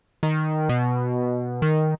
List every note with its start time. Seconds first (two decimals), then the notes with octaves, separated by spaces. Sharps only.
0.23 D#3
0.69 B2
1.62 D#3